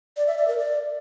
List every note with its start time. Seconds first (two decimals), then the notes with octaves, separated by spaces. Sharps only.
0.17 D5
0.27 E5
0.38 D5
0.48 A#4
0.58 D5